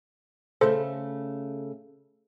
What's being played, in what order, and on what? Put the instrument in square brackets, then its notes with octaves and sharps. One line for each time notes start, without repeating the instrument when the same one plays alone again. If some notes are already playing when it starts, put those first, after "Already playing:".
[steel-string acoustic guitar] C#3 A3 [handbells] A4 C5